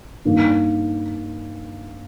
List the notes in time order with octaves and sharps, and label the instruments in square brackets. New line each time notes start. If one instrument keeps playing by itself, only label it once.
[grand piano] G2 D#3 A#3